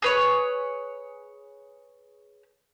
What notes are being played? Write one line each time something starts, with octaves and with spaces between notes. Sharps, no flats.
G#4 B4 C#5